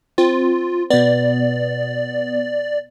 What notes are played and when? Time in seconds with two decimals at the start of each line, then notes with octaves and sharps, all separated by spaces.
0.18 C4 F4
0.90 B2 B3 D5